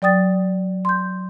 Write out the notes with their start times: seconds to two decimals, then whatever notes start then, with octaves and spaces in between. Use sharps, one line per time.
0.02 F#3 D5 G5 D#6 A6
0.85 C6 G6